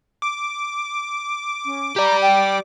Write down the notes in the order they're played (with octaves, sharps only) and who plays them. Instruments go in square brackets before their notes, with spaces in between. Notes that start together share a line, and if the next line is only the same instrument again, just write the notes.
[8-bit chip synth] D6
[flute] C#4
[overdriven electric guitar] G4 D5 [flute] A#5
[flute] G5